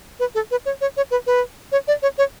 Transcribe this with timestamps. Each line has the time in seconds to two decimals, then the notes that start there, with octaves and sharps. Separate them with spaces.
0.20 B4
0.35 A4
0.51 B4
0.66 C#5
0.81 C#5
0.97 C#5
1.11 B4
1.27 B4
1.72 C#5
1.88 D5
2.02 C#5
2.18 C#5